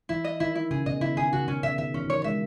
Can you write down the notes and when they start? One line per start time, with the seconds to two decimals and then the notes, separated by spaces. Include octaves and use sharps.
0.09 E3 E4
0.24 D#5
0.40 D#3 E4
0.55 E4
0.71 C#3 G#4
0.86 B2 D#5
1.01 C#3 E4
1.17 D#3 G#4
1.33 C#3 F#4
1.48 B2 C#4
1.63 B2 E5
1.78 D#3 E5
1.94 E3 C#4
2.04 D#3
2.10 E3 C#5
2.24 G#3 E5